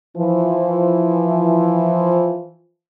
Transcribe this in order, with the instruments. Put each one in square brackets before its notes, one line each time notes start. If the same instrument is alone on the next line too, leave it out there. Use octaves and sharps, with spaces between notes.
[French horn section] E3 F3